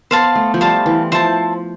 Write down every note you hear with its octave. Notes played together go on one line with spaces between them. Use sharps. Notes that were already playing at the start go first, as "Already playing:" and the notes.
B3 C5 F5 A5 C6
A3
F3
G3 C5 F5 A5 C6
E3
F3 C5 E5 A5 C6